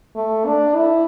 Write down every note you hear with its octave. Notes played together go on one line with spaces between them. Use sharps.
A3
D4
E4